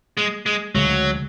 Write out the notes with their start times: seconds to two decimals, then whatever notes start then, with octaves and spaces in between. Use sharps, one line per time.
0.17 G#3
0.46 G#3
0.75 D2 C#3 F#3 G#3